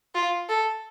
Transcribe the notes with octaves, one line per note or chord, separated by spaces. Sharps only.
F4
A4